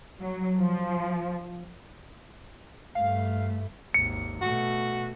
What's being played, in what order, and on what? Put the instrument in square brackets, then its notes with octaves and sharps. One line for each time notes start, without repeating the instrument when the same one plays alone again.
[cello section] F#3
F3
[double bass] G2 A3 [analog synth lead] F5
[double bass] G#1 D#2 [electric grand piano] C#7
[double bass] B2 A3 [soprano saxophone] F#4